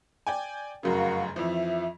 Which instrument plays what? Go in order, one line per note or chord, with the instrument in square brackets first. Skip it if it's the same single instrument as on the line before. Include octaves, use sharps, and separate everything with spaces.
[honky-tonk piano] D5 G5 G#5
[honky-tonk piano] F1 F#2 C#3 [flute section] F#4 A#4 F5
[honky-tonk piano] F2 E3 F3 [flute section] E5